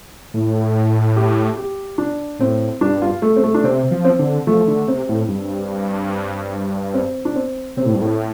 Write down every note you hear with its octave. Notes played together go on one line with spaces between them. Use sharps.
A2
G4
G4
D4
A2 C4
G2 D4
F4
A3
C4
A3
D4
C3 C4
F3
C4
D3
F3 A3
D3
C3 C4
A2
G2
C4
D4
C4
C3 C4
A2
G2
A2